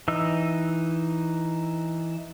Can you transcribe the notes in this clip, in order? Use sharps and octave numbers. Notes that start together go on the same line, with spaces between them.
E3 D#4 E6